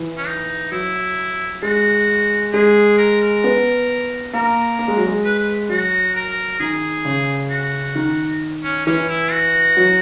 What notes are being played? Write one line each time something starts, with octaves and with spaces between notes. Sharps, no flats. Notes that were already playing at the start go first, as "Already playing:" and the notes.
Already playing: E3
C#4
D#4
F#3 E4
G#3 F#4
G#3 G#4
A#4
A#4
B3
A#3 A#4
A#3
G#3
F#3
G#3
B4
B4
F#3 F#4
A#4
D#3 G#4
C#3
F#4
D#3
C#4
E3 C#4
E4
F#4
F#3